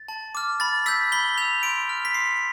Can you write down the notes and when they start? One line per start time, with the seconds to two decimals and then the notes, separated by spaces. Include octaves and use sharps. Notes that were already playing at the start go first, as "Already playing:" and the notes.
Already playing: A6
0.08 A5
0.35 D6 F6
0.60 B5 A6
0.86 E6 G6 B6
1.12 B5 G7
1.38 E6 G6 F7
1.63 C6 D7
1.89 F6
2.05 B6
2.14 C6 C7